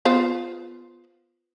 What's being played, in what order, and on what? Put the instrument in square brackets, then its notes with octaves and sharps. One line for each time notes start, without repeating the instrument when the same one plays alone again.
[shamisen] B3 F4 C5